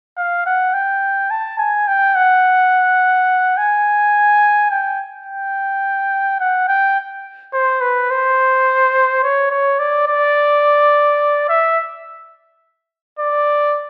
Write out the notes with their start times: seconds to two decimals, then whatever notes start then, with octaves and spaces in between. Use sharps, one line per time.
0.17 F5
0.46 F#5
0.73 G5
1.30 A5
1.58 G#5
1.87 G5
2.15 F#5
3.57 G#5
4.71 G5
5.26 G5
6.40 F#5
6.68 G5
7.53 C5
7.81 B4
8.10 C5
9.23 C#5
9.51 C#5
9.79 D5
10.07 D5
11.49 E5
13.19 D5